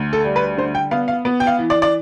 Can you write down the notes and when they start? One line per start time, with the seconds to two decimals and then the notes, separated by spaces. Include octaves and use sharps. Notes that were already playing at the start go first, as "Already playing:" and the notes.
Already playing: D2
0.13 A4
0.24 G3
0.36 B4
0.57 D3 C5
0.75 G5
0.91 B3 F5
1.08 F5
1.25 B3
1.40 G5
1.47 F5
1.59 E3
1.70 D5
1.82 D5